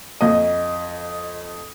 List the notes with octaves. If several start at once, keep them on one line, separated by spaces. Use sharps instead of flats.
F2 D#5